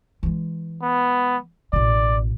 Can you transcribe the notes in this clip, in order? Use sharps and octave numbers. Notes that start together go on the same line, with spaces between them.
E3 G#3
B3
A1 B2 D5